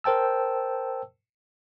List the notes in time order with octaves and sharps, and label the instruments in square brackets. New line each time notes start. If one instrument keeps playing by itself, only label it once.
[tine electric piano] A#4 C5 G5 A5 E6